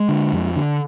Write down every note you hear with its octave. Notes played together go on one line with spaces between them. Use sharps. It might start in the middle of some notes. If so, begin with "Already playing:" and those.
Already playing: G#3
D3
F2
D3